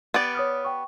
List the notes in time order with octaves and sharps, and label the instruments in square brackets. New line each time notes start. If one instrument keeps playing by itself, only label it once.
[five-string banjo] B3 G4 D5
[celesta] C#5 D#6 F6
G5 C#6